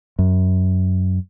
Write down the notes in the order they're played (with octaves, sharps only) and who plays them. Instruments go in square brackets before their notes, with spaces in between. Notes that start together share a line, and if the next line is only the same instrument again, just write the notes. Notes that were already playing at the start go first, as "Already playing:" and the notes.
[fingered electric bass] F#2